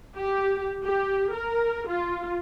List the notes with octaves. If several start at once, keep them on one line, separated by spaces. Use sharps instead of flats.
G4
G4
A#4
F4